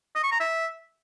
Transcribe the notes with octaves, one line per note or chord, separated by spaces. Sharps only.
D#5
C#6
A#5
E5